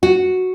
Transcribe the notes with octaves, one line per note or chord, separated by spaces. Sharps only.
F#4